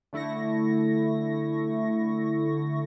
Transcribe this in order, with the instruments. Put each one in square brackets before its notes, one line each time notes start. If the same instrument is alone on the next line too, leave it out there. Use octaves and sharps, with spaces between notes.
[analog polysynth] D3 A3 E4 C#6 A#6